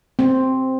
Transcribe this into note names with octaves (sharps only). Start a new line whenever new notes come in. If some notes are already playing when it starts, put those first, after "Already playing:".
C4